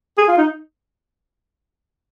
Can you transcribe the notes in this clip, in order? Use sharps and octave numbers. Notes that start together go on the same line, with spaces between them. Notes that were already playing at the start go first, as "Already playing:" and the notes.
G#4
F4
D#4